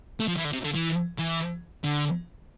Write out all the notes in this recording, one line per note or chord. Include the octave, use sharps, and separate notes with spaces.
A3
F3
E3
D3
C3
D3
E3
E3
D3